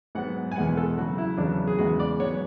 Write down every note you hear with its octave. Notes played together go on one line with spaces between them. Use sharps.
G#2 F#3 B3 F#5
G#5
E2 B2 G#3 B3 F#5
A4
C#3 F#3 A3 F#4
E4
E2 C#3 F#3 B3 D4
G#4
E2 C#3 G#3 B3 F#4
D5
G#2 F#3 B3 C#5